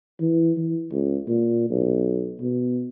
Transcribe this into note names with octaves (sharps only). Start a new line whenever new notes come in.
E3
E3
C#2
A#2
B1
B2